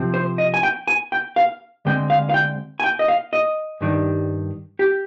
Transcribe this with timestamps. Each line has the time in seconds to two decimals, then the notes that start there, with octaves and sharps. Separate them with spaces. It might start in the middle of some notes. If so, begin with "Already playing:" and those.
Already playing: C3 F3 C4
0.14 C5
0.38 D#5
0.54 G#5
0.63 G5
0.87 G#5
1.12 G5
1.36 F5
1.85 D2 D3 G#3 C4 G5
2.10 F5
2.29 F5
2.34 G5
2.80 G#5
2.84 G5
2.99 D#5
3.08 F5
3.33 D#5
3.81 G2 D#3 G3 D4
4.79 G4